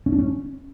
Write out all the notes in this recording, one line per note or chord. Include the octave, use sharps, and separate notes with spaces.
C#4
D4
C#4